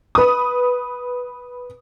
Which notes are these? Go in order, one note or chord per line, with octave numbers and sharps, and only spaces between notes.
B4 D#6